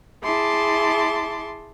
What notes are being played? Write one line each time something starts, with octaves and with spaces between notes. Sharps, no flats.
E4 G#4 A5 C6 D6